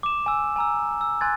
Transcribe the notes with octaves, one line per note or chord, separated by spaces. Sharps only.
D6 E7
G#5 E6
G#5 A#5 E6
E6
G#5 C6 F#6 G#6 A6